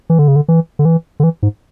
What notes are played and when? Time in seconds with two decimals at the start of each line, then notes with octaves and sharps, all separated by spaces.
0.10 E3
0.19 D3
0.28 C#3
0.36 D3
0.48 E3
0.79 D3
0.85 E3
1.20 D3
1.24 E3
1.43 G#2